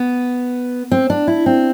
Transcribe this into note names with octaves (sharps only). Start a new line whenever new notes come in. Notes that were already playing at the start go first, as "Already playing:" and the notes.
Already playing: B3
C4
D4
E4
C4